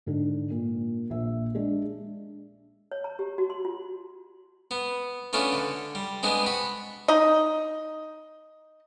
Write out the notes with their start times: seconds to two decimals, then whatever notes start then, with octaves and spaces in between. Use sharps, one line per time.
0.06 G#2 D3
0.50 A#2
1.10 A#1 E5
1.55 G#3 D4
2.91 C#5
3.04 A#5
3.19 G4
3.38 F#4
3.50 C6
3.65 F4
4.71 B3
5.33 A3 B3 C#4 D4 F4
5.53 D3
5.95 G3
6.23 G#3 B3 C4 D4 G#4
6.46 F#4 B5
7.08 D#4 D#5